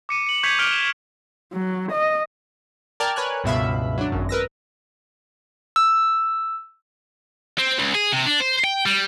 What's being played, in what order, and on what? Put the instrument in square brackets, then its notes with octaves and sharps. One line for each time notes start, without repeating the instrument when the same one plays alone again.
[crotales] D6 C#7 D#7
C#7 F#7
C#6 G6 G#6 B6 C#7 F7
D6 F6 B6 D7 F7 G7
E7
[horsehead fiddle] F#3
D#5
[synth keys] A#4 D5 G5 A5 F6 G#6
A#4 B4 C#5 G#5 F#6
C#2 G2 B2 E5 F5 B5
F#3 D4
G#1 F#2
A#4 B4 E6 A#6
[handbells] E6
[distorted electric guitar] C4
C#2
G#4
C3
D4
C5
G5
G3